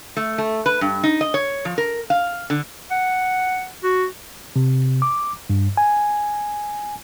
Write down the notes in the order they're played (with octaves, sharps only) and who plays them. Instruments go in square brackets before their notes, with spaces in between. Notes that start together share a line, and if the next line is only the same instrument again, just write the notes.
[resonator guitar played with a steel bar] A3
A3
B4
G2
D#4
D#5
C#5
F3
A#4
F5
D3
[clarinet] F#5
F#4
[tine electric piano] C3
D6
G2
G#5